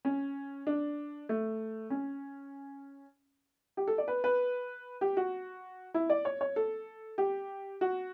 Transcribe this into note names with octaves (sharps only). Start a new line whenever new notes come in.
C#4
D4
A3
C#4
G4
A4
D5
B4
B4
G4
F#4
E4
D5
C#5
C#5
A4
G4
F#4